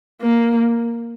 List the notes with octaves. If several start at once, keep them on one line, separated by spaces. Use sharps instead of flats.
A#3